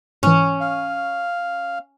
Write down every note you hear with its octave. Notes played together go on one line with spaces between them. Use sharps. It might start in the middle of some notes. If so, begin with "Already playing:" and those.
G#2 E3 C#4
F5